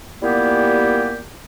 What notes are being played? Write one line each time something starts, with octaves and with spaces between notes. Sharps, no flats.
A#2 G3 A#3 B3 E4 G4